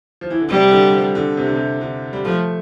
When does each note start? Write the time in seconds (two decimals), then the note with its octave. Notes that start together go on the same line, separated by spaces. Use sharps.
0.21 F3
0.30 E3
0.40 D3
0.49 C3 G3
0.71 D3
0.93 F3
1.15 D3
1.37 C3
1.46 D3
1.55 C3
1.81 D3
2.13 G3
2.25 F3 A3